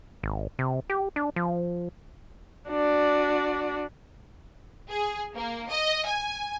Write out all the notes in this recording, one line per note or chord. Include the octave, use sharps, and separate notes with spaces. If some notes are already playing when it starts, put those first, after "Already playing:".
G#1
C3
G4
D4
F3
D4 F#4 D5
G#4
A#3
D#5
G#5